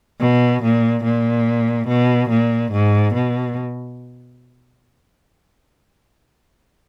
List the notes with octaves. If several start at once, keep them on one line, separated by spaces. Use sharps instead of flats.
B2
A#2
A#2
B2
A#2
G#2
B2